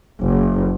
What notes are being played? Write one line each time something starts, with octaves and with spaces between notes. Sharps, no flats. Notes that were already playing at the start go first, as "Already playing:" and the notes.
F#1